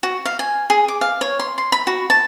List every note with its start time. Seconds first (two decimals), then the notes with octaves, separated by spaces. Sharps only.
0.03 F#4
0.25 F5
0.39 G#5
0.70 G#4
0.88 D6
1.01 F5
1.21 C#5
1.39 C6
1.58 C6
1.72 B5
1.87 F#4
2.10 A5